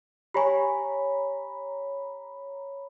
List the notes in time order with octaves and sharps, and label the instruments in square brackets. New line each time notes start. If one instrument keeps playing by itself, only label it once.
[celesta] G4 G#5 [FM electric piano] C#5 A#5 B5